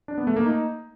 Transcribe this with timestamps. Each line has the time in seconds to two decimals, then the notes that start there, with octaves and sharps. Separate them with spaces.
0.08 D4
0.18 B3
0.27 A3
0.36 A#3
0.46 D#4